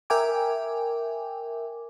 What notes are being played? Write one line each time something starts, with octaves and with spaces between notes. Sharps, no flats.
A#4 E5 G5 G#5 D6